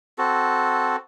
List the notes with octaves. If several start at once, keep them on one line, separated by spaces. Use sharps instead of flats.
C4 F#4 A4